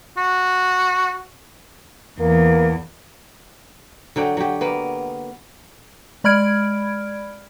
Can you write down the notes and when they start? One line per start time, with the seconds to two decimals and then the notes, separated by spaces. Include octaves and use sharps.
0.17 F#4
2.20 E2 A#3
4.16 D3 F#3 D5 G5
4.37 F#3 G4
4.61 A#3 B3
6.24 G#3 D5 B5 F6 G#6 D7